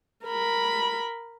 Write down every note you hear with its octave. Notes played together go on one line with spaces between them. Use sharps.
A#4 B5